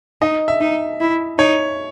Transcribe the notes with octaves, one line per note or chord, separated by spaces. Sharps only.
D#4 D#5
E5
D#4
E4
D#4 C#5